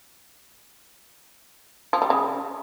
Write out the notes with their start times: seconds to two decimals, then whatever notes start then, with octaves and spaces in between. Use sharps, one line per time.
1.93 F3
2.02 G3
2.10 C#3